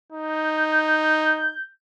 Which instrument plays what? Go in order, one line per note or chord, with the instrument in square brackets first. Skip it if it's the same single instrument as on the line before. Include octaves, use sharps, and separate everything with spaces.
[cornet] D#4 [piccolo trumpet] G6